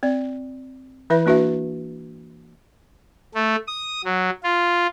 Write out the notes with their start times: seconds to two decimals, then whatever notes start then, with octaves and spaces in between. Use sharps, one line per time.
0.03 C4 D5
1.10 E3 E4 B4 E5
1.26 A#3 D4 F#4 B4 E5
3.34 A3
3.67 D#6
4.04 F#3
4.43 F4